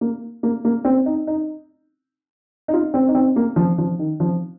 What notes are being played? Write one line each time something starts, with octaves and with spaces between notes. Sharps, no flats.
A#3
A#3
A#3
C4
D#4
D#4
D#4
F4
C4
D#4
C4
A#3
F3
F3
D#3
F3